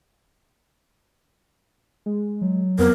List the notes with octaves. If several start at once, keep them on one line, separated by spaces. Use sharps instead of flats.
G#3
F#3
F2 B3 C4 A#4